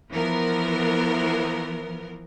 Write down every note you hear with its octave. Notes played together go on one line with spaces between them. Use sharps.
E3 F3 B3 A#4